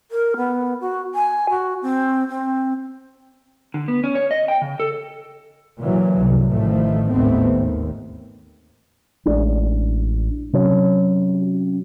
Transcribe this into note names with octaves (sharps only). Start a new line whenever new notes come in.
A#4
B3
F#4
G#5
F#4
C4
C4
D3
B3
C#4
C#5
D#5
G5
C#3
A4
A#2 C#3 E3 F#3
C2 F#2
A1 A2 D#3 F3 A3
G#1 D#2 A2 A3 B3 C4
D#2
A1 A2 G#3 D4
C3 F#3 C#4